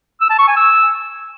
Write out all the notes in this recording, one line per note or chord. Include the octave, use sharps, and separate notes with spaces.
E6
A5
C#6
G#5
E6